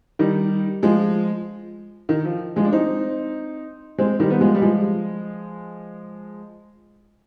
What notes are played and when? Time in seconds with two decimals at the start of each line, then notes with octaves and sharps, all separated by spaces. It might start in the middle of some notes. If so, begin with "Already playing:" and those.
0.19 D#3 G3
0.83 F3 G#3
2.09 D#3
2.25 F3
2.56 F3 G#3
2.65 D4
2.72 C4 D#4
3.98 G#3 C4
4.20 D#3 G3
4.30 B3
4.41 F3 G#3
4.55 G3
4.62 F3 G#3